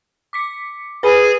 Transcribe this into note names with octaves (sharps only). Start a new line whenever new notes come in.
D6 B6 C#7
G#4 B4 G#5 B5